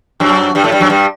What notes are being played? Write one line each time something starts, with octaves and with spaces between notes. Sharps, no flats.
F#2 F#3
G2 G3
A2 A3
G2 G3
F#2 F#3
G2 G3